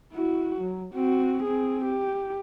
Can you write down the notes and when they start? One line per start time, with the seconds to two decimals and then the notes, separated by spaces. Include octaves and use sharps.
0.13 E4 F#4
0.61 F#3
0.94 C4 F#4
1.43 C4 G#4
1.85 G4